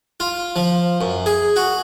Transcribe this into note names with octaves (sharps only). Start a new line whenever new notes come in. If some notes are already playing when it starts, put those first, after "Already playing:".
F4
F3
F#2
G#4
F#4